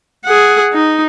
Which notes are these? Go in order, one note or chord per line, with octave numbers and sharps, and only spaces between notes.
G#4 F#5
D#4